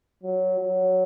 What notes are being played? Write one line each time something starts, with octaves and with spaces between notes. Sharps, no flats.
F#3
F#3